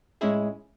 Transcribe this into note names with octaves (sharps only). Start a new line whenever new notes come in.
A2 G#3 C#4 E4 G#4